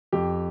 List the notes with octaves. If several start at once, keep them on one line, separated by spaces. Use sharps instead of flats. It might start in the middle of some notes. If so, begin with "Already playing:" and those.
F2 G4